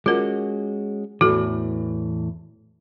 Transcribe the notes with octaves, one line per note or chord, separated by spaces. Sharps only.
G#3 C#4 F4 F#4 A#4
E2 A2 E3 F#4 A4